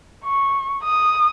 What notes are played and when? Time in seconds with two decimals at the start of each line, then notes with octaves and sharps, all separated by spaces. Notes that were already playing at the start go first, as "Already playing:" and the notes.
0.24 C#6
0.83 D#6